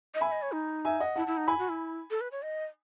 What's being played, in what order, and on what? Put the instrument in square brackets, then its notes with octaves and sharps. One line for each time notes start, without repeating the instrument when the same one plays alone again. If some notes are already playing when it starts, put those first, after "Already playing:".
[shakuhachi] D#5
[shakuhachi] E5 [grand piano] G#5 B5
[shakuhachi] D#5
C#5
D#4
[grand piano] E5 G#5
D#5 F#5
[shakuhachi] E4 [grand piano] F#5 A5
[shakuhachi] E4
D#4
[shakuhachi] E4 [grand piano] G#5 B5
[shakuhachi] F#4
E4
A4
B4
C#5
D#5